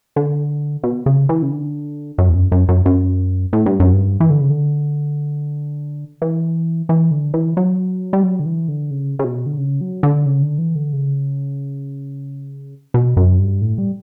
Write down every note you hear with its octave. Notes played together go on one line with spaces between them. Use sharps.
D3
B2
C#3
E3
C#3
D3
F#2
E2
F#2
F#2
F#2
F#2
A2
G2
F#2
G2
E3
D3
C#3
D3
E3
E3
D3
E3
F#3
G3
F#3
D3
E3
D3
C#3
C#3
B2
D3
C#3
F#3
D3
C#3
D3
E3
D3
C#3
B2
F#2
G2
A2
G3